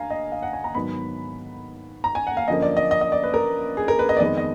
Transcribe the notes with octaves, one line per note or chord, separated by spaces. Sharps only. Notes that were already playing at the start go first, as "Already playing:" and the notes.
Already playing: D2 F5 G#5 A#5
D#5
F5
F#5
G#5
A#5
G#2 D#3 F#3 B3 B5
A#5
G#5
F#5
F5
F#2 D3 F3 A#3 D#5
D5
D#5
D#5
D#5
D5
B4
A#4
G#4
A#4
B4
D#5
D5
F2 D#3 G#3 B3 D#5
D#5